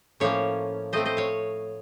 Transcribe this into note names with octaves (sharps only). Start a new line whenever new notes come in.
A2 F3 A#3 C#4 C#5 F5
A2 A3 C4 C5 D#5
C5 D#5
C#5 F5